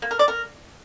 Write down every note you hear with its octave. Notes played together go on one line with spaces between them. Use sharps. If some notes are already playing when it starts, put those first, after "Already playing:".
A#3
A#4
D5
A#4